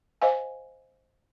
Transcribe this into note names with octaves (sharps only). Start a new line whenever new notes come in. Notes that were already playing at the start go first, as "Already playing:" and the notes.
C5 D#5 F5 G#5